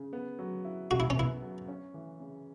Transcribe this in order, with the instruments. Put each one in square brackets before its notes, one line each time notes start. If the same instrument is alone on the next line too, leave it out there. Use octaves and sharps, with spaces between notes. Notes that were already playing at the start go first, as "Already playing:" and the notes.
Already playing: [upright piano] C#3
B3
F#3
E4
[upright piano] F#2 [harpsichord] F#4
[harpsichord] E4
C#4
[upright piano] B3 [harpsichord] E4
[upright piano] F#3
C#4
E3
C#3